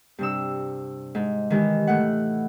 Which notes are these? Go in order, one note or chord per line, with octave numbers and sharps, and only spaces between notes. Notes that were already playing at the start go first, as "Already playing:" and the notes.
G2 C3 E6
G#2
D#3 E3 G#3 G4
A2 A3 F#5